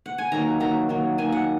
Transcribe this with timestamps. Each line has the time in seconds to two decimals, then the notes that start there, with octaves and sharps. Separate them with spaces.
0.06 F#5
0.18 G#5
0.32 D#3 F#3 A#3 A#5
0.60 D#3 F#3 A#3 A#5
0.89 D#3 F#3 A#3
1.18 D#3 F#3 A#3 G#5
1.32 F#5